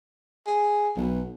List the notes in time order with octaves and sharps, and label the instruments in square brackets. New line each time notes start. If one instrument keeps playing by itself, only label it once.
[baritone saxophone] G#4
[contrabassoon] B1 [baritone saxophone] B2